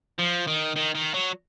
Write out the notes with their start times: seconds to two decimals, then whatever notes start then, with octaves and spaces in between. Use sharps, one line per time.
0.18 F3
0.47 D#3
0.76 D#3
0.95 D#3
1.14 F#3